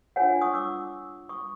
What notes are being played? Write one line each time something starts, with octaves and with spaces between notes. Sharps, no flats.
D4 F4 A4 C#5 F#5 G#5
C#6 D#6
D6 E6
C#6 D#6